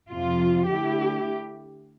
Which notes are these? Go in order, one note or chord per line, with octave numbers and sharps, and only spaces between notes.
F2 C3 F3 F4
D3 A3 E4 G4